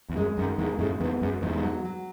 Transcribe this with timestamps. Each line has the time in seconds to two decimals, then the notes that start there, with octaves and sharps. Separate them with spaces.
0.10 E2
0.16 F#2 G#3
0.37 F#2 D#3
0.58 E2 G#2 G#3
0.79 F#2 A2 G#3
1.00 E2 G#2 B3
1.21 F#2 G#3
1.42 E2 G#2 D#4
1.63 F#3
1.85 F#3